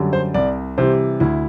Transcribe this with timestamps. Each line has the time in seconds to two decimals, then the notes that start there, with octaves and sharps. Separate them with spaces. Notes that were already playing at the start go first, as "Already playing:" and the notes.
Already playing: F#2 D3 G3
0.13 C5
0.34 C2 D5
0.78 C3 E3 G3 C5
1.20 D2 E4